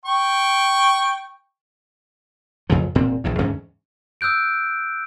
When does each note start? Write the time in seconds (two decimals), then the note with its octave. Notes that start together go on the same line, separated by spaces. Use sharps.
0.06 G5 C#6
2.70 A1 F2 C#3 F3
2.95 E1 A#2 C4
3.24 A#1 E2 A2
3.39 E2 G#2 D3 C#4
4.21 D#6 E6 F#6 G6 D7